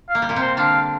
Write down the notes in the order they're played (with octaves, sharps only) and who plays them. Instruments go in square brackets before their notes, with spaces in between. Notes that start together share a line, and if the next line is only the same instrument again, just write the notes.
[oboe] F5
[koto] A#3
G3
A#2 A#3
C3 C4
[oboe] C5
[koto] D3 D4 [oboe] F5